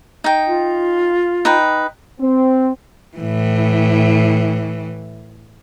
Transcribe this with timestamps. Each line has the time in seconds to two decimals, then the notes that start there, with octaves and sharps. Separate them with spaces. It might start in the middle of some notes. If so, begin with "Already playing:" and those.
0.24 D#4 G5
0.47 F4
1.45 D#4 B4 G5
2.20 C4
3.17 A2 E3